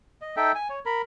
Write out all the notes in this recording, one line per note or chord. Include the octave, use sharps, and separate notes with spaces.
D#5
D#4 A4 E5 G5
G#5
C#5
A#4 B5